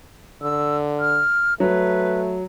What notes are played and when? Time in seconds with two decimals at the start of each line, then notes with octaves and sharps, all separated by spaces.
0.42 D3 E6
1.00 F6
1.60 F#3 A3 B4